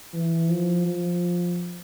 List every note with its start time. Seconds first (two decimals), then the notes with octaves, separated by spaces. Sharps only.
0.13 E3
0.50 F3
0.86 F3